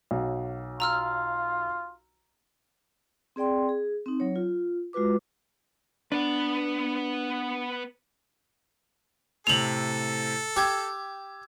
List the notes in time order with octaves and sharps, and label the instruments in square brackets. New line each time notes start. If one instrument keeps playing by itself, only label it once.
[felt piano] B1 F#3
[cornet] F4 [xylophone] A#5 E6 F6
[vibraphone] C4 G#4 D5 G5 C6
G#4
C4 D#4
F#3 C#5
F4
G#3 F4 F#4 B4 D6
[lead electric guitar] B3 B4 [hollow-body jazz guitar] D4
[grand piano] A2 C3 [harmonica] A4 [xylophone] F7 F#7
[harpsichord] G4 [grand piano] E6 G#6